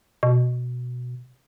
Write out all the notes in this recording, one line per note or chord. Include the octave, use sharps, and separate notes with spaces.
B2